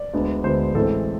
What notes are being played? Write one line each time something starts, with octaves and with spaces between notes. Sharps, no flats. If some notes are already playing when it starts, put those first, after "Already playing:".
Already playing: D5
D2 D3 G#3 B3
D2 D3 G#3 B3 C5
A1 A2 E3 G#3 C4 A4